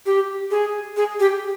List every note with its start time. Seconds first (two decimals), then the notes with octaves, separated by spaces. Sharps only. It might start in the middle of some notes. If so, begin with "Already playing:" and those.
0.06 G4
0.51 G#4
0.97 G#4
1.20 G4